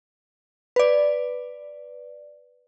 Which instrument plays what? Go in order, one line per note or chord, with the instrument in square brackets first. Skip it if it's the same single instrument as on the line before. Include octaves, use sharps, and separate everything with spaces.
[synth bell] B4 D5